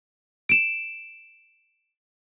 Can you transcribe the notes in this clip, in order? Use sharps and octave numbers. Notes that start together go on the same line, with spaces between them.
D7 E7